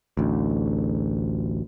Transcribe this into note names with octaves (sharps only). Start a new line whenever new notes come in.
A1 D2